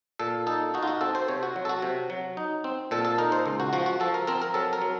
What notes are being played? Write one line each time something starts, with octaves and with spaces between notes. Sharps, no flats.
A#2 A4
D#4 A4
D#4 F#4
F4
F#4
C4 A4
C5
C3 C#5
F#4
F#3
A4
F#4
C3
F#3
D#4
C4
A#2 A4
A4
D#4 A#4
C5
C#2
F#4
F3 F#4
F#4
F3 A4
A#4
C4 A#4
A#4
F#3 A4
A#4
F#3